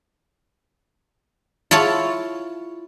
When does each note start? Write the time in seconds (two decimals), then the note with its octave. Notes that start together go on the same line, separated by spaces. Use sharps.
1.71 E4 F4 C#5 A5